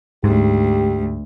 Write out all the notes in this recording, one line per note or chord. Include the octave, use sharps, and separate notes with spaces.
D2 G#2 G4